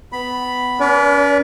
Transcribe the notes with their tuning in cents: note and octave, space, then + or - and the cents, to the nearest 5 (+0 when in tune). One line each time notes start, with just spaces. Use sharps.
B3 +20 B5 +0
C#4 +40 B4 -40 D5 -35